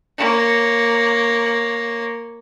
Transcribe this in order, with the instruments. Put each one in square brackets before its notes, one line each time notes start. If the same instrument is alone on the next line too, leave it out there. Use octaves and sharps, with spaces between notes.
[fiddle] A#3 C#5